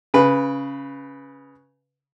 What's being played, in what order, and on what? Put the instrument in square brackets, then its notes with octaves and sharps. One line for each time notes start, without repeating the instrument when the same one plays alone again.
[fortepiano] C#3 B4